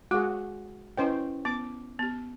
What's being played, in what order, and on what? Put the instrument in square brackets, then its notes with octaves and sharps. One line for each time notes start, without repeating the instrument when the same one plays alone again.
[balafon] G#3 D6 [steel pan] F#4 G#4
[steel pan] C#4 C5 G5 [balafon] E4 B4 D#5
[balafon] B3 [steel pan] D6
[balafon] B3 G4